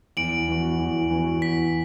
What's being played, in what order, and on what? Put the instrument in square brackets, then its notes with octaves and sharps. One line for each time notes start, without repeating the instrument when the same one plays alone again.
[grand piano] E2 [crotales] D7 F#7
[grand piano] E3 B3 F#4
E2
E3 B3 F#4
[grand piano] E2 [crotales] B6